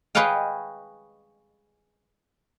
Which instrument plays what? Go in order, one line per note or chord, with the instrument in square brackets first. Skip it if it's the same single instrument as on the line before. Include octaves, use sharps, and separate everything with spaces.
[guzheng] G#4 B4 C#5 D#5 F5 G5